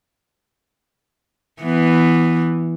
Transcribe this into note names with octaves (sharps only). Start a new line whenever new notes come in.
E3 B3